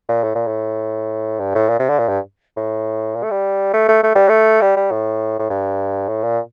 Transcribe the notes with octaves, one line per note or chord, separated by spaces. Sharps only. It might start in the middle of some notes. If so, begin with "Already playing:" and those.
A#2
A2
A#2
A2
G2
A2
A#2
C3
D3
A#2
G2
A2
A#2
A3
G3
A3
A3
A3
G3
A3
G3
G3
A2
A2
G2
A2
A#2